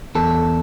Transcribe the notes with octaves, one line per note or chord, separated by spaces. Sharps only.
E2 A4